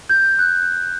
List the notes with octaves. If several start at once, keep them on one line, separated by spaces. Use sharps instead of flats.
G6
F#6